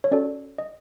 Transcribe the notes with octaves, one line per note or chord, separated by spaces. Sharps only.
C#5
C#4 F#4 A4 D5
D#5